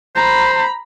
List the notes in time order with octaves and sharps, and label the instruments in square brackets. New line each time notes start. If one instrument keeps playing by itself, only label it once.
[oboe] C5 [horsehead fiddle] A#5 B5